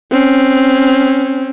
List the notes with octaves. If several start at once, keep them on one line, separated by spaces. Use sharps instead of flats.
C4 C#4